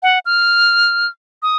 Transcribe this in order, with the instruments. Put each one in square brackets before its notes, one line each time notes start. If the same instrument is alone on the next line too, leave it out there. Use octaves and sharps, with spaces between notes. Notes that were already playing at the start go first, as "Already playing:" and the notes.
[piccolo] F#5
F6
D#6